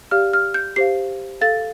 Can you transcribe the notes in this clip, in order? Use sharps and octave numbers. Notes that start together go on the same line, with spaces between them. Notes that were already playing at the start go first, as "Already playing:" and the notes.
G4 D5 F5 F6
F6
G6
G4 C5 F5 C7
A4 F5 A6